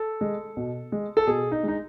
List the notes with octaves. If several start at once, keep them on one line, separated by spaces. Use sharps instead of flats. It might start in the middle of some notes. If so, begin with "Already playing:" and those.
Already playing: A4
G#3
B2
G#3
A4
B2 G#4
D#4
G#3 D#4